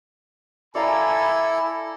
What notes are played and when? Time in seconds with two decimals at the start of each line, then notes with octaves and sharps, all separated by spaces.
0.75 E4 A4 D5 F5 G#5 A#5 B5